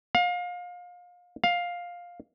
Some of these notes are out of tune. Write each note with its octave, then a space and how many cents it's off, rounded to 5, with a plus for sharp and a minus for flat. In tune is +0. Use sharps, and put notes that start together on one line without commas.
F5 +30
F5 +10